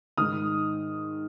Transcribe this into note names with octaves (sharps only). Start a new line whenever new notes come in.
G#2 D#3 D#6 F6